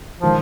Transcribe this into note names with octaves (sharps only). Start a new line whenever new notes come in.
D#3 F3 G#3